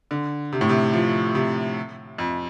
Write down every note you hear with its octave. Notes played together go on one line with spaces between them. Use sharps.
D3
C3
A2
C3
F3
C3
F2